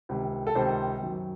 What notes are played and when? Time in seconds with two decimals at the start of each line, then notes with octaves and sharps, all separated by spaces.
0.09 C#2 C3 D#3
0.47 A4
0.55 C#2 C3 D#3 C5
1.01 F#2 D#3